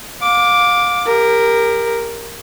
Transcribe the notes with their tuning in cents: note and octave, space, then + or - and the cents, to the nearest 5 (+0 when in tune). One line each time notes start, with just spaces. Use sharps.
F5 +35 D6 +0
G4 +35 A#4 +0